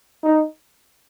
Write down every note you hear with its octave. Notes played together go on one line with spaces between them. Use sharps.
D#4